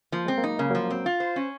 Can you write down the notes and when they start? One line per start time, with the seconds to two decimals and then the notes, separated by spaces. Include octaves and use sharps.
0.12 F3 A#3
0.26 G#3 C4
0.38 F#3 A#3
0.43 D#4
0.59 C#3 A#3 C#4
0.70 F#3 A#3
0.75 F3
0.90 F#3 C4
1.06 F4
1.20 C5
1.36 C#4